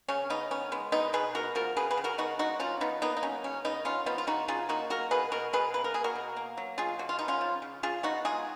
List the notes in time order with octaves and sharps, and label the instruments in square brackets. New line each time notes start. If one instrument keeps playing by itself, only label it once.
[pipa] C#3 C#4
C#3 B3 D#4
B3 C#4
G#3 B3
B2 B3 D#4
B2 G#4 B4
B3 F#4 A#4
F3 F#4 A#4
C#3 G#4 B4
G#4 B4
C#3
F#4 A#4
B3 D#4 F#4
G#3 D#4 F#4
F3 C#4 F4
F3 B3 D#4
A#3 B3 D#4
D#4
F#3 C#4
C#3 C#4
C#3 B3 D#4
B3 C#4 F4
F3 B3 D#4
F4
C#3 D#4 F#4
C#3 F4 G#4
A#3 D#4 F#4
F#3 F#4 A#4
B2 G#4 B4
B2 F#4 A#4
B2 G#4 B4
A#3 B4
A#4
A#3 G#4
F#4 A#4
B2
A#3
F#3
B2 F4 G#4
B2 F#4
F4
B3 D#4
C#4 F4
F3
C#3
C#3 F4 G#4
B3 D#4 F#4
G#3 F4 G#4